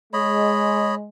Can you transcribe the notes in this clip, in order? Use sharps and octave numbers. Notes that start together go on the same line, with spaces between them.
G#3 C#5 D#5 B5